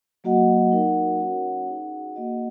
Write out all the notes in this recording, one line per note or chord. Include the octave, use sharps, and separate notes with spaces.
F#3 A#3 F#4 D#5 F#5
D#4 A#4 F#5
C#4 F#4 C#5 F#5
D#4 G#4 F#5
A#3 F#4 D#5 F#5